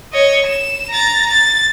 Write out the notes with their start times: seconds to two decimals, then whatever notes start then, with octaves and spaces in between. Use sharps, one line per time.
0.13 C#5 D#5
0.46 E7
0.90 A#5 A6
1.30 A6